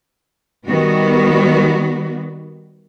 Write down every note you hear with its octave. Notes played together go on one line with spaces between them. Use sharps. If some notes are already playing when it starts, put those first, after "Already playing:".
D#3 G3 B3 F#4